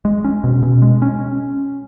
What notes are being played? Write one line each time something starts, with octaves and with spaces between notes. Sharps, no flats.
G#3
C#4
B2
B2
G#3
C#4